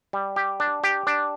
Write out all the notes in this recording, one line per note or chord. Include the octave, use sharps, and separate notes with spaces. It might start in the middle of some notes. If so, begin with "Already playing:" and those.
G3
G4
D4
G4
D4